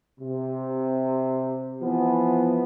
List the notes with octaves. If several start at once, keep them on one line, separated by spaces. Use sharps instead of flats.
C3
E3 F3 B3